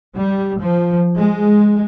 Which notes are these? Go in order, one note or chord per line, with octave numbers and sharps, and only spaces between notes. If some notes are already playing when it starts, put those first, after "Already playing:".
G3
F3
G#3